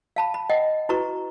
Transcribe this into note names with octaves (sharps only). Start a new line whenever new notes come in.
F5 A5 B5
B5
D#5 F#5 G5
E4 F#4 B4 A#5 C#6